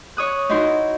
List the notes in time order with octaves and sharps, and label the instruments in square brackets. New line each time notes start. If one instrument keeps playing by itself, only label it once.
[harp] C#5 D#6 F#6
D#4 E4 F#4 C6